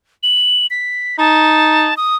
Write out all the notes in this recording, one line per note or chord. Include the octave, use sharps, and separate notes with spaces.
F#7
B6
D#4 A5
D#6